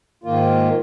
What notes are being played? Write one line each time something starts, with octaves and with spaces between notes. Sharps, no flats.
G#2 D#3 A#3 F4